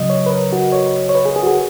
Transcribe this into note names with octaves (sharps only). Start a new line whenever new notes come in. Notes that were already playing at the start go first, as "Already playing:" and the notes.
Already playing: C#3 F#3 D#5
C#5
B4
A#4
F#4
C#5
C#5
B4
G#4
G#4
F#4
G#4